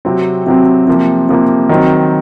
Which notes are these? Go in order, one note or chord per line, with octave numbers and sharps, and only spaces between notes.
C3 F#3 C4
C3 F#3 C4
C3 F3 A#3
C3 F3 A#3
D#3 F#3 C4